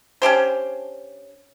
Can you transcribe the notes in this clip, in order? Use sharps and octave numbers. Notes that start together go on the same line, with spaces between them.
C#4 D4 G4 C5